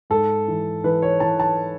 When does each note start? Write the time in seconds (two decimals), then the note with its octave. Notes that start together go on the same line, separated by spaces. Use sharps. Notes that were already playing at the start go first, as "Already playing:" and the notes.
0.10 G#2 A4
0.48 E3
0.84 E3 B4
1.02 C#5
1.20 E3 A5
1.40 A5